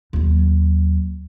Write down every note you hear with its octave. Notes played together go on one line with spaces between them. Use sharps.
D#2 F#3